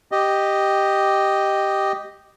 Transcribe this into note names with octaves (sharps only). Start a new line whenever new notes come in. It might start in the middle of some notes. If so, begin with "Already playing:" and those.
G4 D#5